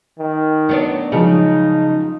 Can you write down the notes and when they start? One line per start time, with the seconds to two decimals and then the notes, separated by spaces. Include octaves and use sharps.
0.19 D#3
0.69 F#3 B3 D4
1.12 C#3 F3 F#3 G#3 D#4